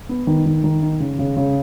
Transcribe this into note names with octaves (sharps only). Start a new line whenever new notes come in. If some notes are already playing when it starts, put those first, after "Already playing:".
B3
D#3
D#3
D#3
D#4
C#3
C#3
C#3